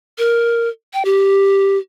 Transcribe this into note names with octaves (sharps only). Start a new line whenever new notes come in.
A#4
G5
G4